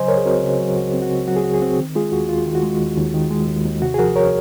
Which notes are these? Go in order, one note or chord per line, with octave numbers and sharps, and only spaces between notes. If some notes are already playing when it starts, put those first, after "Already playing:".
Already playing: C#3 F#3 C5 D#5 G#5 C6
C#2 A#4 C#5
G#4
C4 F#4 A#4
C#3
F#3 F#4
C#2 F#4
C4
F#4
C#3
F#3 F#4
G#4
C#2 F#4
G#4
C4 F#4
D#3
G#3 F4 G#4
D#2 F#4
D#2 F4
D#3
F#4
G#3
D#2
D#2
D#3
G#3
D#2
D#2
C3 F#4
G#4
F3 F#4 A#4
C#2 A#4 C#5